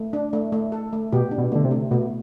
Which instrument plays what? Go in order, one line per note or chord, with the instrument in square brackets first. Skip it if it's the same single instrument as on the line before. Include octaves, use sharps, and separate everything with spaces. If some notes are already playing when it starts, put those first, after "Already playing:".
Already playing: [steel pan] A3
D4
A3
A3
A4
A3
[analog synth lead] B2 [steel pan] G4
[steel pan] D4
[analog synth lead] B2
[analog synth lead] D3 [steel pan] A3
[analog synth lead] C3
[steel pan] A3
[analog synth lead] B2 [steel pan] A3